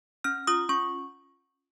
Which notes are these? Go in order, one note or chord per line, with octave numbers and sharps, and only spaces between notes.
C#4 F6
F4 D#6
C#4 C#6